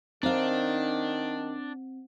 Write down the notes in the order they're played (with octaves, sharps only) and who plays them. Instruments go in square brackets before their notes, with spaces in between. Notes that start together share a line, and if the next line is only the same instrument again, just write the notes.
[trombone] D#3 [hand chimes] C4 [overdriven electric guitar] D4 [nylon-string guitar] D#4 C5 F5